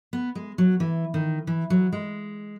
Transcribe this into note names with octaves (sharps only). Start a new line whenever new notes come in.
B3
G#3
F#3
E3
D#3
E3
F#3
G#3